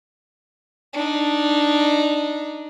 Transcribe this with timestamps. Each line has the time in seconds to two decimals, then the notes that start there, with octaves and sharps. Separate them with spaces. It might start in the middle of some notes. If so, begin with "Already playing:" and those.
0.93 D4 D#4